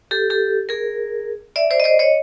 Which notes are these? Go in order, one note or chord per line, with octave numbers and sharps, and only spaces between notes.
G4 A4
G4 A4
G#4 A#4
D5 E5
C5 D5
D#5
C5 D5
C#5 D#5